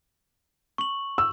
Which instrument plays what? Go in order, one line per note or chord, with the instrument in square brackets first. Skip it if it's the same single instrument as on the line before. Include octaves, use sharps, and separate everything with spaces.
[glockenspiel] C#6 F#7
[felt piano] E6